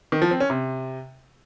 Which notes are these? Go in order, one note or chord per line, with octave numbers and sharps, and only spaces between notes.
D#3
F3
C4
C#4
C3